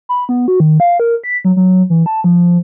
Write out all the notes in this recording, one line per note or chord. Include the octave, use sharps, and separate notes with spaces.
B5
B3
F#4
D#3
F5
A#4
B6
F#3
F#3
E3
A5
F3